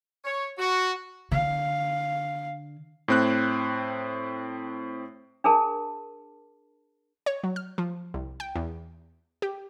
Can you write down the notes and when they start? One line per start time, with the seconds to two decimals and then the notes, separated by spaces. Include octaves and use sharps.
0.25 C#5
0.58 F#4
1.31 D3 F5
3.08 A2 C4 F#6
5.44 D4 G#4 A#4 A5
7.26 C#5
7.44 F#3
7.56 F6
7.78 F3
8.14 C2
8.40 G5
8.56 E2
9.42 G4